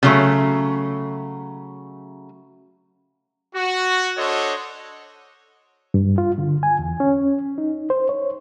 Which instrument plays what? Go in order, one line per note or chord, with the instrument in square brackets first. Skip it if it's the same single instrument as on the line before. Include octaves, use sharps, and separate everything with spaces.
[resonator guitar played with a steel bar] C#3 F#3 A3
[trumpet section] F#4
D4 A4 C5 C#5 D#5 F#5
[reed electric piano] G2
F4
D3
G#5
E2
C#4
D#4
C5
C#5